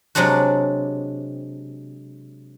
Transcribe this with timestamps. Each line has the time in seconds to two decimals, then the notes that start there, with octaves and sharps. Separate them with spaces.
0.15 C3 F#3 G#3 D4 F#4